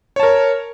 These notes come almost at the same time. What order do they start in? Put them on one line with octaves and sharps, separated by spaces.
C#5 A5 A#4